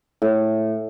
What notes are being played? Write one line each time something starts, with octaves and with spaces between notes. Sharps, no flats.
A2